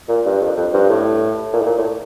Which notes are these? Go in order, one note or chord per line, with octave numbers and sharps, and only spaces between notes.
A#2
G2
F2
F2
G2
A2
A#2
A2
A#2
A2